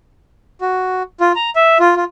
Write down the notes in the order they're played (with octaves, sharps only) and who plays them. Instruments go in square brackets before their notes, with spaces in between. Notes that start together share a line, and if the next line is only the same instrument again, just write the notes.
[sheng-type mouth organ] F#4
F4
A#5
E5
F4
F4